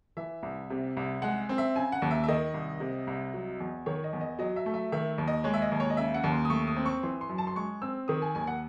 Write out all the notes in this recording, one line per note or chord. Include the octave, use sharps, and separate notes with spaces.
E3 E5
C2
C3
C2
G#3 F#5
C4
E5
C#3 G#5
F#5
D#2
E5
E5
D#3 D#5
C2
C3
C2
F#3
E2
D#3 C#5
D#5
E2
D#5
F#3 D#5
E5
A3
E5
D#3 E5
D#2
D#5
G#3 C#5
E5
D#5
D#2
C#5
D#5
C#3 E5
F#5
D#2
C6
D#6
A3 C#6
D#6
C4
C#6
E3 C6
C6
F#2
A5
C6
G#3 C#6
C4 E6
D#3 D#6
G#5
D#2 G#5
F#5